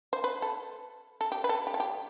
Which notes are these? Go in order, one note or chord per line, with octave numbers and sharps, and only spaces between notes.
C5
B4
A4
A4
G4
B4
A4
G4
A4
G4